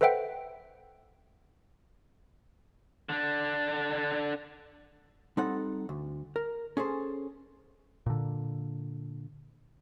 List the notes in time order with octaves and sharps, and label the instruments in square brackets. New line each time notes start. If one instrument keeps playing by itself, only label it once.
[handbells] A4 B4 C5 E5 F#5 G5
[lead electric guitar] D3 D4
[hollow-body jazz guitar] G3 C4 D#4 A4 F#5
D2
A#4
C#4 G#4 A4 C5
[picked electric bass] A#2 D3